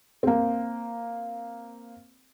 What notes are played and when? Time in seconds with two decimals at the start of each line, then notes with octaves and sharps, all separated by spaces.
0.23 A#3 C4